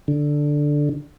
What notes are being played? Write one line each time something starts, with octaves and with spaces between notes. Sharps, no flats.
D3